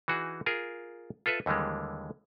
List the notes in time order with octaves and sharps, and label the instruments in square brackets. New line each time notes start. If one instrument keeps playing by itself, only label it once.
[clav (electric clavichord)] E3 D#4 F#4 G#4
F4 G#4 A#4
F4 A4 B4 E5
D#2 D3 E3 G3 G#3